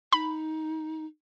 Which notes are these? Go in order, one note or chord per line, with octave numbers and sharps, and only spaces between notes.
D#4 B5